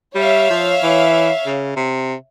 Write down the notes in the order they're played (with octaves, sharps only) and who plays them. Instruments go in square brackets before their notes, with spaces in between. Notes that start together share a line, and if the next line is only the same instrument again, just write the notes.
[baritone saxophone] G3 [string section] C#5 E5 F5
[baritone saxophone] F3
E3
C#3
C3